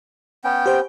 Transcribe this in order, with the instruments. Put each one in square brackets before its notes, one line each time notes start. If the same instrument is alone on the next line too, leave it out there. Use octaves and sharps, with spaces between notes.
[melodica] B3 C#4 G5
[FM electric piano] G4 C5